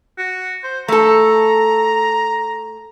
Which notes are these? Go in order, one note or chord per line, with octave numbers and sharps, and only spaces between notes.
F#4
C5
A3 A4 A#5